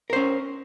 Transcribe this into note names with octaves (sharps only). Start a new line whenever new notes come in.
C#4 A#4 C5